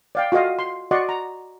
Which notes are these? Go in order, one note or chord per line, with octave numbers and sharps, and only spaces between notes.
D5 F5 G5
F4 F#4 A4 D#5 F5
C6
F#4 D5 D#5 F#5 C6 C#6
A#5